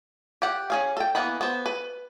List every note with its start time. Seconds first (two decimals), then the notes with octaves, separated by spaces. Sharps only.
0.42 G4 F#5
0.70 C#4 G#4 F5
0.97 A4 G5
1.15 E3 A#3 B3 F#5 B5
1.41 B3 C5
1.66 B4